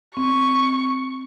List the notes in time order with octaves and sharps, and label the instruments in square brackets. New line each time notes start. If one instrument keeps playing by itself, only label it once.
[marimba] C4 [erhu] C#6